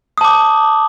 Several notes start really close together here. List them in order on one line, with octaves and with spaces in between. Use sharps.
D#6 A5 D6